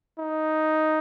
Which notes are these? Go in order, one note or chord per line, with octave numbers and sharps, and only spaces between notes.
D#4